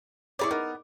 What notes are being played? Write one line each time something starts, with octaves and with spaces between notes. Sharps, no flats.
E4 G#4 C#5 D5 A#5 C#6
B3 D#4 A#4